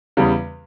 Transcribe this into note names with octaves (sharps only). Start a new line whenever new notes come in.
E2 C#3 G3